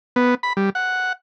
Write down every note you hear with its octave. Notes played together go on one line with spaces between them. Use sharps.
B3
B5
G3
F#5